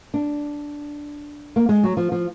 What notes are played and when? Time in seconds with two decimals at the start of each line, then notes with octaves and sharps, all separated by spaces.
0.14 D4
1.56 A#3
1.69 G#3
1.84 F#3
1.97 F3
2.12 F3